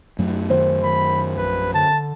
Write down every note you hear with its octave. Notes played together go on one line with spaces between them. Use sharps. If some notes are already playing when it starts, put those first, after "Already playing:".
F#2 F#3 A3
D#3 C5
D#3 B5
A#1 B4
D3 A5